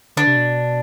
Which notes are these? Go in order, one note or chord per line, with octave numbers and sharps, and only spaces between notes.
D3 D4
C3
B2